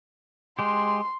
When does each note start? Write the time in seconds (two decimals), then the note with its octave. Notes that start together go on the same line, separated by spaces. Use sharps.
0.59 G#3 G4 C6